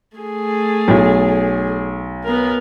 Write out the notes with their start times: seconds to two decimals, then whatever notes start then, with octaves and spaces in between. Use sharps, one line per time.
0.17 A3 G#4
0.88 B1
2.24 B3 A#4